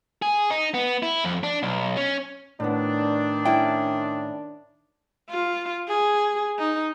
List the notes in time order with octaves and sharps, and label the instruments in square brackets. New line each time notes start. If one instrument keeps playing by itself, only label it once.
[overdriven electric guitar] G#4
D#4
B3
E4
F2
D4
B1
C#4
[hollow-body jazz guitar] A2 B3 [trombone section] D#3 D4
[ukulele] C#4 E4 G5
[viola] F4
G#4
D#4